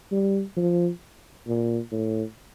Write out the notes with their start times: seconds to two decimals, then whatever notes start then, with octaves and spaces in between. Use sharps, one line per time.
0.11 G3
0.57 F3
1.47 A#2
1.92 A2